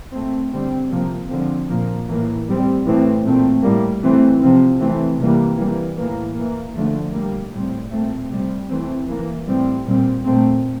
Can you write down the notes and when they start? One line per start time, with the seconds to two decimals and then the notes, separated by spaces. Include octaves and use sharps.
0.13 A#2 A3 C4
0.52 D3 G3 C4
0.91 C3 F3 A#3
1.30 D3 F3 C4
1.69 A#2 F3 A#3
2.08 A2 E3 A#3
2.47 A2 G3 C4
2.86 A2 E3 A3 C4
3.25 A#2 A3 C4
3.63 A2 G3 A#3
4.02 E3 A3 C4
4.41 C3 F3 C4
4.80 E3 A3 C4
5.19 C3 E3 G3 A#3
5.58 E3 G3 A#3
5.97 A2 E3 A#3
6.35 E3 A#3
6.75 D3 F3 A3
7.13 A#2 G3 A#3
7.52 A2 G3 C4
7.91 A#2 A3 C4
8.30 C3 G3 C4
8.69 E3 A3 C4
9.08 E3 A#3
9.47 A2 G3 C4
9.86 A#2 G3 C4
10.25 A#2 A3 C4